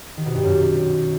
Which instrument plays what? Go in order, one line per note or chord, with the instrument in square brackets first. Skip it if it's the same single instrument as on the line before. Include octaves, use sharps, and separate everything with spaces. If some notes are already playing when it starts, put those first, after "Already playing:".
[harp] D#3
B2
G2
F#2